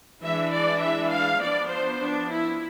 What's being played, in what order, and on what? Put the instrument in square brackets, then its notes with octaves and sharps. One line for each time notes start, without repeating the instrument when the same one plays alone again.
[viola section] E3 G#3 D4 E5
D5
E5
F5
F3 B3 D4 D5
C5
D4
E4